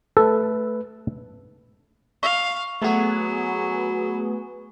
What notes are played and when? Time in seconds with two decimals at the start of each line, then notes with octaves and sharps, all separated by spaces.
0.17 A3 A4 B4
2.23 F5 C#6 F7
2.82 F#3 A3 B3 F#4 G#4